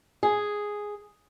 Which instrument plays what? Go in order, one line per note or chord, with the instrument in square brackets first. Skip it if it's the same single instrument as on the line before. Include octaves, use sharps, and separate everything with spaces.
[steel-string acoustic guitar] G#4